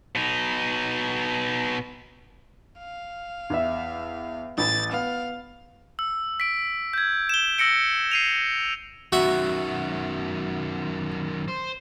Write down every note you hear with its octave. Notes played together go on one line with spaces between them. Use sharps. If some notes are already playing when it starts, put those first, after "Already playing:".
B2 D#4
F5
E2 E5
A1 B5 A6
B3 F5
E6
B6 D7
G6 G#6
E7 G7
E6 A#6 C#7 D7
C7 D#7 F7
F#2 D#3 F#4 E5 F#5
C5